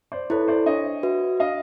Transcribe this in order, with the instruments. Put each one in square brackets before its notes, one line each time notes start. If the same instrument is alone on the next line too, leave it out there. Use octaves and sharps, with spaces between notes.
[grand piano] C5 D5
[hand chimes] E4 A4 [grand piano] B4 C#5
[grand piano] C5 D5
[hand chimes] D4 [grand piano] C#5 D#5
[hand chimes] F#4 B4 E5
[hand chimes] D4 [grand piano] D#5 F5